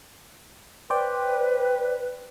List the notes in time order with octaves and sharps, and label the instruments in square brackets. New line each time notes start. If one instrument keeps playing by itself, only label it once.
[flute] B4 [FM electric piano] C5 D5 G5